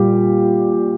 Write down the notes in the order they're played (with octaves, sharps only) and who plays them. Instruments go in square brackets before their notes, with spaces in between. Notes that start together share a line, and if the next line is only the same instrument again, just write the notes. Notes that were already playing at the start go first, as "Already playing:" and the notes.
Already playing: [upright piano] A#2 G3 G4